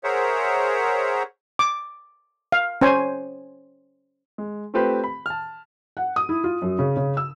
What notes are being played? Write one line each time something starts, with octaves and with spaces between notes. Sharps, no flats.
G#4 A#4 C5 C#5 E5 F#5
D6
F5
C#4 C5 G#5
G#3
A3 C4 F4 G4 B4 C5
B5
A5 F6
F#5
D#6
E4
F4
F#2
C#3
C#3
E6